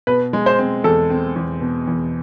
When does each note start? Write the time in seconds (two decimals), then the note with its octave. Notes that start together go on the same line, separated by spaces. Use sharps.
0.07 B2 B4
0.33 G#3
0.46 C5
0.59 C4
0.84 E2 A4
1.10 C4
1.36 E2
1.61 B2
1.87 E2